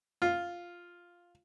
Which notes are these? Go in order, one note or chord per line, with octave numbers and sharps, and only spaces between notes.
F4